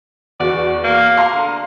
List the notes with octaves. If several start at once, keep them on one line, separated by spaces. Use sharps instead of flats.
E2 F#4 D5
A#3
F5 A#5 C6
D3